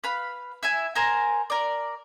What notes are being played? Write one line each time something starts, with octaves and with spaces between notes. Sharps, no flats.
B4 F5 B5
E4 E5 G#5
A#4 C5 G#5 A#5
A#4 D5